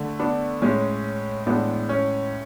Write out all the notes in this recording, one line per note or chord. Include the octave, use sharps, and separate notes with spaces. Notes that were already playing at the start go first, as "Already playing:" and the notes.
Already playing: D3 A3
B3 D4
A2 G#3 C#4
A2 E3 G#3 B3 D4
C#4